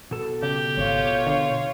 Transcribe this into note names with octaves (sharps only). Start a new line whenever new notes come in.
B2 A4
C#3 G4
G#1 F4 C#5
D3